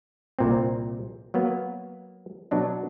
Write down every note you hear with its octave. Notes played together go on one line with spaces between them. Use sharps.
C2 A#2 C4
F#3 A#3 B3
B2 F#3 D4 D#4